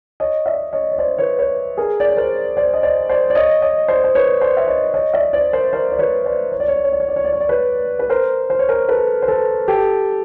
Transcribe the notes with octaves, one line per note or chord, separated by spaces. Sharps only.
C#5 D#5
D5 E5
C#5 D#5
C#5
C5 D5
B4 C#5
B4 C#5
G#4 A#4
D5
C#5
A#4 C5
C5 D5
D#5
C5 D5
C5 D5
D5
C#5 D#5
C#5 D#5
C5 D5
C5
B4 C#5
C5 D5
E5
C#5 D#5
C#5 D#5
D5 E5
C5 D5
A#4 C5
A#4 C5
D5
B4 C#5
C5 D5
C#5
D5
C#5
D5
C#5
D5
C#5
D5
C#5
D5
C#5
D5
B4 C#5
B4
A#4 C5
C5
C#5
A#4 C5
A4 B4
C5
A4 B4
G4 A4